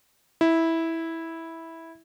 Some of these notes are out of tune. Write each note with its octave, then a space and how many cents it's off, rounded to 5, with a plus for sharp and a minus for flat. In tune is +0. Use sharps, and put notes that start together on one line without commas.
E4 -10